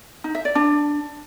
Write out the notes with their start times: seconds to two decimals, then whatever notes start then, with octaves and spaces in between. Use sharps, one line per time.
0.24 D#4
0.35 E5
0.45 D5
0.55 D4